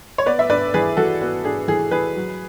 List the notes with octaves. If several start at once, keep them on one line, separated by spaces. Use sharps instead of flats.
C#5
B3 B4 D5
E5
D4 B4 D5
E3 G#4 B4
E3 F#4 A4
B3 F#4
D4 G#4
E3 G#4
E3 G#4 B4
F#3